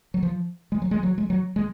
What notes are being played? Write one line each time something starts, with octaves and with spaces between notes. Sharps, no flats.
F#3
F3
G#3
F#3
G#3
F#3
G#3
F#3
G#3